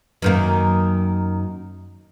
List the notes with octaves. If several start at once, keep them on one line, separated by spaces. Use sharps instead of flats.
F#2 D#3 A#3